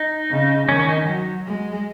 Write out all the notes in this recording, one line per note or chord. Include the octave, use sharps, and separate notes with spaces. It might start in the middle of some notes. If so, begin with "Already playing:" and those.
Already playing: D#4
C#3
D#3 C#4
C#4
D#4
F#3
G#3